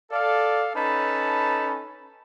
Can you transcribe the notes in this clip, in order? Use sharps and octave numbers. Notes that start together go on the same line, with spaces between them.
A4 D5 F5
C#4 D#4 A4 B4 A5 B5